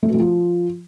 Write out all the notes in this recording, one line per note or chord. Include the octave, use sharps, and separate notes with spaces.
A3
B2
A3
F3